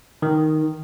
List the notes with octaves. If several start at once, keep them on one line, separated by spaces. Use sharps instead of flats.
D#3